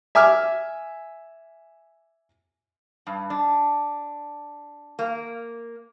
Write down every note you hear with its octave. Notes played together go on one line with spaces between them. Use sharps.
E5 G#5 D6 F6
G2
D4
A#3